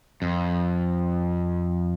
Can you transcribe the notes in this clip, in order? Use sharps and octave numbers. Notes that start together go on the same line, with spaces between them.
F2